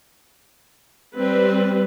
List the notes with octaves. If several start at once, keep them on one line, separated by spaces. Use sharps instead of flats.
G3 C4 B4